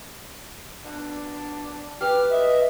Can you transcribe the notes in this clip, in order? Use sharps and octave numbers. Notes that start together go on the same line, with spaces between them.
B2 D4
G4 B4 F6
D#5 E5